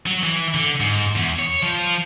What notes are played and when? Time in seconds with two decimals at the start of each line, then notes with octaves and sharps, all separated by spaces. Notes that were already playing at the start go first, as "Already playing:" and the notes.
0.06 F#3
0.23 E3
0.54 D3
0.80 G#2
1.16 E2
1.39 C#5
1.62 F3